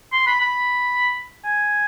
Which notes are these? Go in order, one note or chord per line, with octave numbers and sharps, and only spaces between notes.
C6
B5
B5
G#5